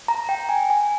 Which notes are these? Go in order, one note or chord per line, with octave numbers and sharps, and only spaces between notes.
A#5
G5
G#5
G#5